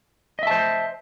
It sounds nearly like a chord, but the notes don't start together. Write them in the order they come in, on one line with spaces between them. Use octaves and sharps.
D#5 E5 A5 C5